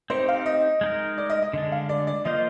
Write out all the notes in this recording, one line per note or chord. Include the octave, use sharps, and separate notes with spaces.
C4 D#4 G4 C5
F5
D#5
G#3 D#4 A#4
D5
D#5
D#5
D3 G#3 D4
F5
D5
D5
F3 A#3 F4 C5 D#5